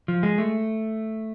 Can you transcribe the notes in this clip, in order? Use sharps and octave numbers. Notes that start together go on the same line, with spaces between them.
F3
G#3
A3